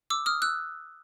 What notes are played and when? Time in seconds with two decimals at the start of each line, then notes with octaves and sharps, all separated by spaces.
0.10 D6 E6
0.26 D#6 F6
0.42 E6 F#6